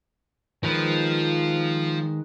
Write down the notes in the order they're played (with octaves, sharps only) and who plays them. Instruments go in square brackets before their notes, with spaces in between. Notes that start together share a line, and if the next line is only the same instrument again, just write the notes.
[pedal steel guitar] D#3 G#3 B4 [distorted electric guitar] F3